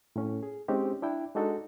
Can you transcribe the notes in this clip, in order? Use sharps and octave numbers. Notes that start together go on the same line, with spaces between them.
A2 C#4
G#4
G#3 C4 C#4 D#4 G4
D4 E4 G5
G#3 D4 D#4 F#4 A4